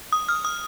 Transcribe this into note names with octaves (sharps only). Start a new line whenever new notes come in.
D#6
F6
D#6